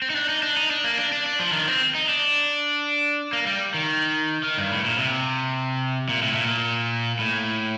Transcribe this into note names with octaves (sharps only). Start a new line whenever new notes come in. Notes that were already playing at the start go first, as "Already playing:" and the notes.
C4
D#4
D4
D#4
D4
D#4
D4
A#3
D4
D4
D4
F3
D#3
C4
D#4
D4
A#3
G3
D#3
D#3
G2
A2
A#2
C3
A#2
A2
A#2
A2